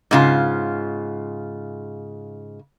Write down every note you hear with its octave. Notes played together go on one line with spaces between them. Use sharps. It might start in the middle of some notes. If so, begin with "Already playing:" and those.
G#2 C#3 F4